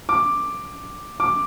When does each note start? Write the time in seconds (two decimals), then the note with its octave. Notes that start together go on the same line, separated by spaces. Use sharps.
0.09 D6
1.20 D6